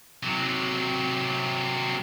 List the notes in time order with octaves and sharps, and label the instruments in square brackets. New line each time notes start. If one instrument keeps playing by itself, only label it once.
[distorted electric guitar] C3 F#3